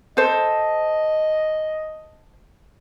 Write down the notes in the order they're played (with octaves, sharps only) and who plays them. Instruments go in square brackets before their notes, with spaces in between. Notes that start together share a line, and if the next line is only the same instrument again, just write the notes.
[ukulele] A4 C5 [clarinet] D#5